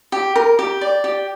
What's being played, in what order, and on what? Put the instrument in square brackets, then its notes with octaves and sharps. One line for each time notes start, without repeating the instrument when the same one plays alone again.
[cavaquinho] G4
A#4
G4
D5
G4